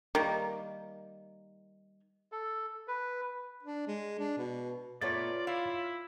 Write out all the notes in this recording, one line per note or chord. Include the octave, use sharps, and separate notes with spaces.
D#3 G3 A#3
A4
B4
D4
G#3
D4
B2
A#2 A3 B3 F4 C#5 D5 A6
E4 F5